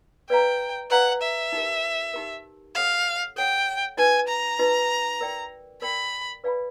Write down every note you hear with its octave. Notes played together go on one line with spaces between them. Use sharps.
B4 D5 F5 G5 A#5
B4 D5 F5 F#5 A#5
E5
D#4 G4 A#4
D#4 G4 A#4
A4 C#5 F5 F#5
A4 C#5 F#5 G5
D#4 F#4 B4 D#5 G#5
A#5
D#4 F#4 B4 D#5
A#4 D5 G5
A#4 D5 G5 B5
B4 D5 F5 G#5 B5